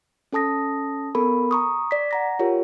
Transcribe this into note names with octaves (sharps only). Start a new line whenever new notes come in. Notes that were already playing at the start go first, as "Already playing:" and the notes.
C#4 A4 A5 D#6 A#6
B3 A4 A#4 B5
A#5 C#6 D#6
D5 B6
F#5 A#5 A#6
F4 G4 A#4 C#5